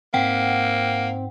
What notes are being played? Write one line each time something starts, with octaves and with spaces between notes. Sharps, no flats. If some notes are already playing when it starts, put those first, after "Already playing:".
G#2 A#3 C4 F#5 G5